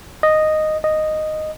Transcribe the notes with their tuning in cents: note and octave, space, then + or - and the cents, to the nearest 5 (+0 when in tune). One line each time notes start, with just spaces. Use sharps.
D#5 -5
D#5 -5